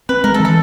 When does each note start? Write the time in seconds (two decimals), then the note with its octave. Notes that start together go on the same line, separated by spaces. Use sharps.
0.09 C4 B4
0.24 G#3 A#4
0.34 A4
0.40 E3
0.45 A4